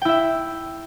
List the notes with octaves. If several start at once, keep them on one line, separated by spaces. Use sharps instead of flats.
E4 E5 G5